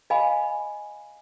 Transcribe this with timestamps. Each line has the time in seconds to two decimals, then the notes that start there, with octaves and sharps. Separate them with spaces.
0.10 D#5 F5 G#5 B5